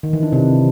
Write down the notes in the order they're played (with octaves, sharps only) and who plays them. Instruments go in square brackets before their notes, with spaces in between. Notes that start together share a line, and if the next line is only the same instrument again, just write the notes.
[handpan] D#3
E3
D4
C3